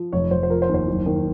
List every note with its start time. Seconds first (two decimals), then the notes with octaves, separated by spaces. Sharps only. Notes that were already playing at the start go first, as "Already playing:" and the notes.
Already playing: F3
0.12 F1 C#5
0.31 F1 C5
0.43 C5
0.49 F3 A#4
0.62 C5
0.69 D#2
0.74 C5
0.87 F#1
1.06 D#3